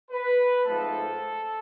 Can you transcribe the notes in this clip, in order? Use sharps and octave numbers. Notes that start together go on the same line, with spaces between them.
B4
G#2 F3 A3 C4 A4